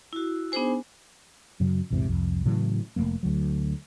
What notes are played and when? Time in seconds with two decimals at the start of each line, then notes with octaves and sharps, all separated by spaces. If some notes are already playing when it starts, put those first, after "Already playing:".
0.13 E4 F#4
0.52 B3 D4 D#4 G#4 C5 G#5
1.60 F#2 C#3 F#3
1.90 A#1 E2 G#2 C3
2.09 C2 F2
2.46 A2 C#3 E3 F#3
2.96 F1 G2 A3 A#3
3.23 D2 F#3